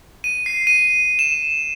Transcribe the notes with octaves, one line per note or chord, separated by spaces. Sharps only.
D#7
C7
D#7
E7